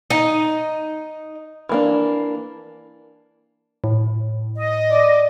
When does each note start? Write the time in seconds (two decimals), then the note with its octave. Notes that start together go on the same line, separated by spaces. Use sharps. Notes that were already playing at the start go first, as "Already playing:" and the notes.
0.10 D#4 D#5
1.69 E3 A#3 D4
3.84 A2
4.56 D#5
4.91 D5